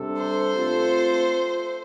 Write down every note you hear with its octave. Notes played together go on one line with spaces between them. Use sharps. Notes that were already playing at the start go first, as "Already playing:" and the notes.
Already playing: C3 G3 D4 A4
C5
A3 C4 F4 A4